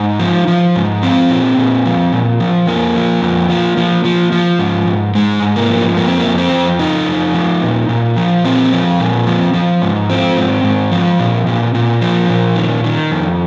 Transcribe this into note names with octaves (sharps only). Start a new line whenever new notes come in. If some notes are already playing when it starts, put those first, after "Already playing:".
Already playing: G#2 D#4
F3
F3
G#2
F3 C4
A#2
A#2
F3
A#2
F3
F2 A#3
F3
F2
F3
F3
F3
F3
G#2
G#2
G#2 G#3
G#2
A#3
F3
F2 A#3
C4
A#3
F2
C4
F2
F3 D#4
F2
F3
A#2
A#2
F3
A#2 C4
F3
A#2
F3
F3
G#2
F3 C4
G#2
G#2
F3
A#2
A#2
A#2
F3
A#2
D#3
D#3
F2